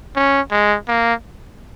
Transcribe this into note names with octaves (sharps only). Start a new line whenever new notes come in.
C#4
G#3
A#3